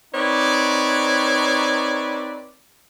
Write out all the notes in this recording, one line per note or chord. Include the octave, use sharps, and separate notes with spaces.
C4 D#4 B4 C#5 D5